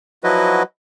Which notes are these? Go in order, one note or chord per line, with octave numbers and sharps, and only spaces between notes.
F3 F#3 E4 F#4 B4 D#5